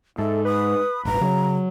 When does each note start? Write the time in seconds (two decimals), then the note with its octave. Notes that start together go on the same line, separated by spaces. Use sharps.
0.18 G#2 A4 E5
0.45 B4 D#6
1.05 D#1 G#1 A#5
1.21 C#3 F#3